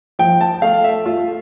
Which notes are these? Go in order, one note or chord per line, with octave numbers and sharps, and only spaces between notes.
F3 G5
A5
A3 F5
E5
A3 F4